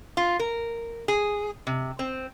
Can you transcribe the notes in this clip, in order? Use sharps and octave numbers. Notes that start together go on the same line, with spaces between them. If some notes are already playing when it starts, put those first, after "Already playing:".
F4
A#4
G#4
C3
C4